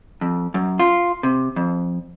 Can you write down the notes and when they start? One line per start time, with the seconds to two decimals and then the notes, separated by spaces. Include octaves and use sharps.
0.21 F2
0.54 F#2
0.79 F4
1.23 C3
1.56 F2